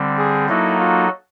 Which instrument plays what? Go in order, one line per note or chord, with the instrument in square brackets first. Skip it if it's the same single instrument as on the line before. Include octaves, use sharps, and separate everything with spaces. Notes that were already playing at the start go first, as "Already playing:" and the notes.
Already playing: [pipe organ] D3 G3 C4
[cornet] G#4
[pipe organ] F#3 A#3 D#4 F#4 A4 [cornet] E4
[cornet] F4